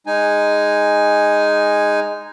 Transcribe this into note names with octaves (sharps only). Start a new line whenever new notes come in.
G#3 D#4 G#5